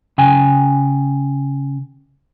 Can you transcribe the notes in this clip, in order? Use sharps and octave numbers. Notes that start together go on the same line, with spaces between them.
C#3 G5 G#5